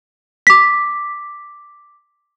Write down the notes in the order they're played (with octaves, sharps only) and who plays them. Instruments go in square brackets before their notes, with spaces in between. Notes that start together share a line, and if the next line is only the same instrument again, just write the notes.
[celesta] D6 B6